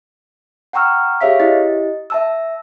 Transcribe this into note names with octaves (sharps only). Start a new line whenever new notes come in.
F#5 G5 A#5 C#6 E6 F6
G4 G#4 C#5 E5 F5 B6
E4 G4 D#5 A6
E5 A5 E6